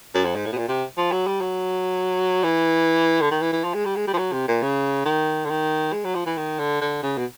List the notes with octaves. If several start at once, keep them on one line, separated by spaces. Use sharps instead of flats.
F#2
F2
G#2
A2
B2
A#2
C3
F3
F#3
G3
F#3
E3
D3
D#3
E3
E3
F3
G#3
G3
G#3
G3
F3
F#3
C3
A#2
C#3
D#3
D3
D#3
G#3
F#3
F3
E3
D#3
D3
D3
C#3
B2